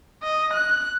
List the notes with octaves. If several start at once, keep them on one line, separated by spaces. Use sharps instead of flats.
D#5
F#6